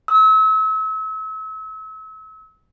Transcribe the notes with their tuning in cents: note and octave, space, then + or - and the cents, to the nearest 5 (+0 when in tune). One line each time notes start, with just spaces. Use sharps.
E6 -35